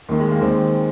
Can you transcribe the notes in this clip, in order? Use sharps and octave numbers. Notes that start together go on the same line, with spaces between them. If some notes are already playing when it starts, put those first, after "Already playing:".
D#2 D#3
G#3
A#3
D#2 D#3 G#3 C4